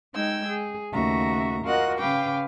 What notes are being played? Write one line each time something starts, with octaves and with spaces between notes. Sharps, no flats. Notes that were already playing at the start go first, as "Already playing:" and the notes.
G#3 D#4 G5 E6 G#6
G#4
D#2 C#3 A3 F#4 E5 A#5
F4 F#4 A#4 D#5 F#5 F#6
C#3 B4 F5 G5 D6